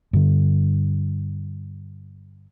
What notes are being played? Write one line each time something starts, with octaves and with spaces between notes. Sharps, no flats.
G2 D3